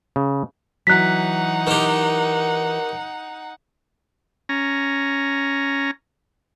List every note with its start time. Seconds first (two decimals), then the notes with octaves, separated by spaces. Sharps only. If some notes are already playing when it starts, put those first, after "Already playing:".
0.16 C#3
0.87 E3 F#3 D#4 F#5 F#6 B6
1.67 D#3 G4
4.49 C#4 A#5